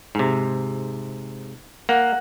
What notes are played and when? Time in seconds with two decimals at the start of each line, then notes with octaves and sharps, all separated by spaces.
0.15 G#2 C3
1.89 A#3 F#5